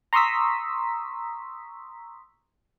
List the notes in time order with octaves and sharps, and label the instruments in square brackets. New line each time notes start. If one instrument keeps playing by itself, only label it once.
[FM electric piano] A#5 C6 C#6 D#6 E6 B6